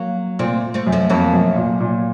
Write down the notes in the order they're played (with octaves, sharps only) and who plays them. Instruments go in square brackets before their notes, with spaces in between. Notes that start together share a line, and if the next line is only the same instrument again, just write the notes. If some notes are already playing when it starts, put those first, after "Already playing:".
Already playing: [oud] F#3 A#3
[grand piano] A#2 [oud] A3 C4
[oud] A3 C4
[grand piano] F#2
[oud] F3 A3
[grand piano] F2 [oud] F#3 A#3
[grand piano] F#2
A#2
A#2